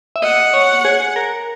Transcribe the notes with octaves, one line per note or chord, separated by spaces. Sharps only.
E5
D#5 F#5
C#5
G#4
A#4